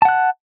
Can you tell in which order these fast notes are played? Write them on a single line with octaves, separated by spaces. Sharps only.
A5 F#5 F#6